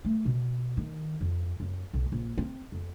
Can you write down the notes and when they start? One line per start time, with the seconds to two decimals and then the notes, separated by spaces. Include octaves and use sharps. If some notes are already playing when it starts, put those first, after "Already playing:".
0.05 A3
0.25 B2
0.77 D#3
1.21 F2
1.60 F#2
1.94 B1
2.12 A#1
2.38 C4
2.72 F2